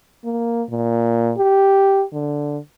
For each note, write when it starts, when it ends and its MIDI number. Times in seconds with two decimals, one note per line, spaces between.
0.24 0.63 58
0.69 1.32 46
1.37 2.04 67
2.12 2.58 50